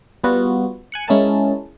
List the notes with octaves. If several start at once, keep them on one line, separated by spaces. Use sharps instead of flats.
G3 B3 F4 F#4
G#5 F#6 C#7
G#3 C#4 E4 G#4 A#4 A5